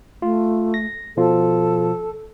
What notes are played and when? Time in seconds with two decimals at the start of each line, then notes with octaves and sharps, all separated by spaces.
0.22 A3 F4
0.74 A#6
1.17 B2 F3 F4 A4